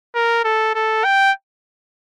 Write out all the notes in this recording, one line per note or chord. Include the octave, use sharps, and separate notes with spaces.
A#4
A4
A4
G5